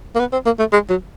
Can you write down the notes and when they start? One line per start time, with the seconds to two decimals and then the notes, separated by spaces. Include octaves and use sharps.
0.16 A#3
0.20 B3
0.33 C4
0.46 A#3
0.59 A3
0.73 G#3
0.90 F#3